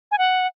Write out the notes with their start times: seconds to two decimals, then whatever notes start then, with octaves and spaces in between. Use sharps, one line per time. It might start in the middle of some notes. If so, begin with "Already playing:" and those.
0.11 G#5
0.18 F#5